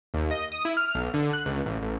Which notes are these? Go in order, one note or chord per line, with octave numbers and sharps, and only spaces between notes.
D#2
D#5
D#6
E4
F6
B1
D3
F#6
C#2
A1
A1